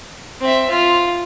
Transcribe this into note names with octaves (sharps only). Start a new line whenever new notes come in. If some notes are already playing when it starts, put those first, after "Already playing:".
C4 E5
F4